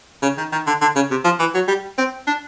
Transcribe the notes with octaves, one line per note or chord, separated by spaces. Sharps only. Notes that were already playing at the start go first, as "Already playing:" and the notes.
C#3
D#3
D#3
D3
D3
C#3
C3
F3
E3
F#3
G3
C4
D4